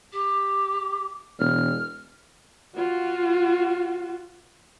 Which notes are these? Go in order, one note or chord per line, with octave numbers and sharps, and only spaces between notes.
G4
E1 F6
F4 F#4